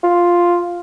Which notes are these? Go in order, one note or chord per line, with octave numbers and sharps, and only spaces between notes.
F4